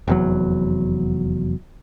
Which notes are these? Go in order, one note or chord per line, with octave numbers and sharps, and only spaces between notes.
F1 E2 F#3